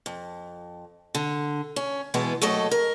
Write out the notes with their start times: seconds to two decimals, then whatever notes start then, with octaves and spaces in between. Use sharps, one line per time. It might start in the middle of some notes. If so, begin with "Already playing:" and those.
0.06 F2
1.15 D3
1.76 C#4
2.14 B2 E3 G#3 B3
2.41 D#2 F#3 A3 A4 D#5
2.71 A#4